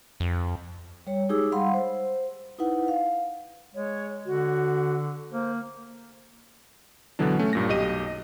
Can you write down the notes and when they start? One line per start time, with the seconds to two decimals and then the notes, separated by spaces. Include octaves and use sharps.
0.20 F2
1.07 G3 C#5
1.29 G#3 D#4 G4 G#4 D6 E6
1.52 G3 F5 F#5 B5 C6
1.73 C5
2.58 D#4 E4 B4 F#5
2.88 F5
3.75 G#3 C#5
4.26 D3 F#4
5.32 A#3 C5
7.19 B2 D3 E3 F#3 D4
7.39 A3 C#4
7.53 G2 A#2 A#6
7.69 B1 G4 D#5 D#7